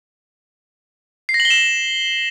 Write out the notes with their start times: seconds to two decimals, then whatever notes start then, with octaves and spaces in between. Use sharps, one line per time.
1.29 C7
1.34 A#6
1.40 F#7
1.45 G7
1.50 E7